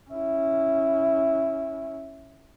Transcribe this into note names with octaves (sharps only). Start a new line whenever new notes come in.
C#4 E4